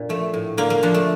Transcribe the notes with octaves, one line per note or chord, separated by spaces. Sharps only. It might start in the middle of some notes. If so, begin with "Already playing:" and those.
Already playing: A#2 D4
F3 A3
A2
D3 A#3
A#3
F3 D4
A3